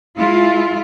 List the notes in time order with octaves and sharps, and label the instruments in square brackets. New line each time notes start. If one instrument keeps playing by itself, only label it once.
[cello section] G#3 E4 F4